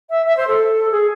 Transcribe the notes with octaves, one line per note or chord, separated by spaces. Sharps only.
E5
E5
C5
A4
G#4